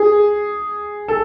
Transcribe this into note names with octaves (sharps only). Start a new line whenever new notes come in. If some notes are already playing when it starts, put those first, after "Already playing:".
Already playing: G#4
A4